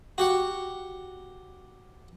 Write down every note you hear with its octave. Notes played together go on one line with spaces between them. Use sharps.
F#4 G4 F#5